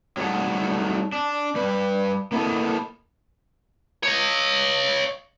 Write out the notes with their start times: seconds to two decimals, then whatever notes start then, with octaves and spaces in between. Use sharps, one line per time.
0.17 F#3 G3 A3 D#4 G#4 F#5
1.12 D4
1.55 G3 B4
2.32 A#3 B3 E4 A4 D#5
4.03 C#5 D#5